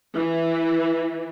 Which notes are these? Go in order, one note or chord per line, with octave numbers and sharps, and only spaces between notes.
E3